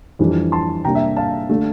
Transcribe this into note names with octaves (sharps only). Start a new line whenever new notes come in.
F2 E3 G3 D4
A5 C6
C3 G3 A#3 D4 G5 A#5
E5
F5 A5
D3 A3 D4